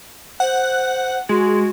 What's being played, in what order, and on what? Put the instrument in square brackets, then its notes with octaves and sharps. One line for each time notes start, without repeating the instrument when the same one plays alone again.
[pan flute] C5 [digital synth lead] F#5
[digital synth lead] G#3 [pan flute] F#4